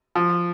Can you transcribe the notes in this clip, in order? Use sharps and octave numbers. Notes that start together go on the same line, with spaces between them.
F3